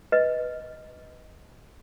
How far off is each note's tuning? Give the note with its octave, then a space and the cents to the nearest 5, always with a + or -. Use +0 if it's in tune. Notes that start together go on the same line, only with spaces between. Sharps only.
B4 +0 D#5 +10